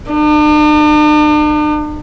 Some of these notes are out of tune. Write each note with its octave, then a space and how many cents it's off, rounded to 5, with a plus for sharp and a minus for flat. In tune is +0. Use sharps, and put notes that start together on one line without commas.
D4 +45